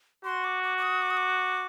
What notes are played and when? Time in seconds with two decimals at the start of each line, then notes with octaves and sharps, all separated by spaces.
0.24 F#4 C6
0.44 D6
0.64 D6
0.78 D6
0.82 D#6
1.02 D6
1.10 D#6
1.17 D6